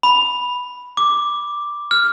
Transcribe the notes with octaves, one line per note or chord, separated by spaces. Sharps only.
B5
D6
F6